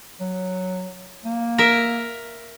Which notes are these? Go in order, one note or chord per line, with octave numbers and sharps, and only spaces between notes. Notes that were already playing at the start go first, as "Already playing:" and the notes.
F#3
A#3
A#4 E5